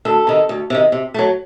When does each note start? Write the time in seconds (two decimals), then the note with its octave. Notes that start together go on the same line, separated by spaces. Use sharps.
0.05 D2 A4
0.27 C3 D#3
0.49 D2
0.70 C3 D#3
0.92 C3
1.14 F#3 A3